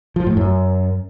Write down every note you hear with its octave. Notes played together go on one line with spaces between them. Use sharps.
F3
A2
F#2